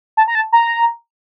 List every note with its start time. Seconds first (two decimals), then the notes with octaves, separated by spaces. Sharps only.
0.17 A5
0.28 A#5
0.35 A5
0.53 A#5